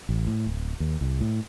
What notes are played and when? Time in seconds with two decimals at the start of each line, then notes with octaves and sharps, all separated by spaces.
0.09 A1
0.27 A2
0.46 D1
0.80 D#2
1.01 C2
1.21 A2